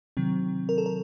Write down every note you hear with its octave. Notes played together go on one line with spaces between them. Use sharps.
C3 D#3 F#3 C4
A#4
A4
A#4